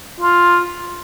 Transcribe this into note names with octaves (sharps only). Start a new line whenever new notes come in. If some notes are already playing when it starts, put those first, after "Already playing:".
F4